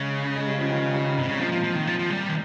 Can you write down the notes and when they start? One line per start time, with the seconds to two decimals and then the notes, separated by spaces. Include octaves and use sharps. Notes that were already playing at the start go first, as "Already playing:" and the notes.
Already playing: C#3 G#3
0.24 G#3
0.36 G#3
0.47 G3
0.59 F3
0.70 D#3
0.94 G3
1.17 G#2 C3
1.29 C#3
1.34 C3
1.40 A#2 F3
1.52 F3
1.64 F3
1.75 D#3
1.87 F3
1.99 F3
2.10 G3
2.29 D#3